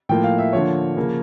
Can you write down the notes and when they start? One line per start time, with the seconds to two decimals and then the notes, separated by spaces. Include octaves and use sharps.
0.09 A2 F3 A#3 G5
0.24 F5
0.38 E5
0.53 D3 F3 A#3 C#5
0.97 C#3 F3 A#3